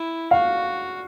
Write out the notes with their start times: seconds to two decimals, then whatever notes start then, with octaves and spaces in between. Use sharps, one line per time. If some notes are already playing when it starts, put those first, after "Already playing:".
Already playing: E4
0.31 F#4 F5